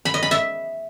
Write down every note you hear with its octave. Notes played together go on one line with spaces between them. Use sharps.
B5
D#5
B5
E5